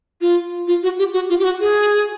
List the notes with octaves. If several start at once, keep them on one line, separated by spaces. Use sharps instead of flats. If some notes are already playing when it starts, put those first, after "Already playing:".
F4
F4
F#4
G4
F#4
F4
G4
F#4
G#4